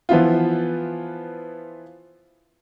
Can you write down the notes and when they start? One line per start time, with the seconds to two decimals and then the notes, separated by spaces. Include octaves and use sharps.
0.09 E3 F3 B3 E4 F4